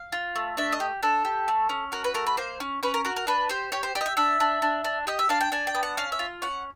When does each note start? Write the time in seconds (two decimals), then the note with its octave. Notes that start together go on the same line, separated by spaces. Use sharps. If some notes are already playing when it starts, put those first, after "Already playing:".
Already playing: F5
0.12 F4
0.36 A3
0.57 D4 E5
0.72 D#5
0.80 G4
1.03 D4 A4
1.25 G4
1.48 A3
1.69 C#4
1.92 F#4 A#4
2.04 B4
2.14 A3 A#4
2.27 B4
2.37 A#3 C5
2.60 C#4
2.83 C#4 B4
2.94 A#4
3.05 F#4 A#4
3.16 A#4
3.27 D4 B4
3.49 G4 C5
3.72 G4 C#5
3.83 C5
3.95 G4 D5
4.01 D#5
4.06 E5
4.17 D4 E5
4.40 D4
4.62 D4
4.84 D4
5.07 G4 D#5
5.19 E5
5.29 D4 F5
5.41 G5
5.52 D4 G#5
5.67 G5
5.75 B3
5.83 F#5
5.97 C#4 F5
6.12 E5
6.19 F4
6.42 C#4 F#5